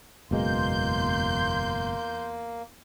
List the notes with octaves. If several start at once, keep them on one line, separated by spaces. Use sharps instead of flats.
F#1 E2 B2 G#3 A#3 C6 G6